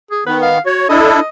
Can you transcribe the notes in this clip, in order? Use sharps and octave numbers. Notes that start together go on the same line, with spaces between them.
G#4
D#3 B3 B4
F5
F#4 C#5
D4 E4 A4 D#5